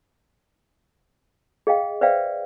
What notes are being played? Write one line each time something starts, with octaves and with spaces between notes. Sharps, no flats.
G#4 D#5 F5 G5
B4 C5 D5 E5 F5 G5